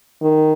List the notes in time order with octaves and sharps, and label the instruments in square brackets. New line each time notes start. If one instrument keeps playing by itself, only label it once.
[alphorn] D#3